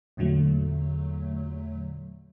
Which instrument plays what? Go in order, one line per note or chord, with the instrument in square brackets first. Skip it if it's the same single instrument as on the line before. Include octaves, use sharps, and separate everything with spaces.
[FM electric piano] E2 A#2 D3 F#3 A3